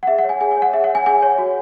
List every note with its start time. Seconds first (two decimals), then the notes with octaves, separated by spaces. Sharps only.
0.03 F#5
0.07 G#4 E5
0.18 F#5
0.24 C#5
0.29 G#5
0.41 G#4 G#5
0.51 G#5
0.57 C#5
0.62 F#5
0.73 G#4 E5
0.84 F#5
0.90 C#5
0.95 G#5
1.06 G#4 G#5
1.22 C#5
1.38 F#4